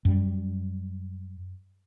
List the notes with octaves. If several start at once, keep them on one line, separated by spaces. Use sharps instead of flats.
F#2 G3